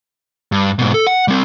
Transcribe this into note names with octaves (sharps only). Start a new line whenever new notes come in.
G2
G#2 B2
A4
F#5
G3 C4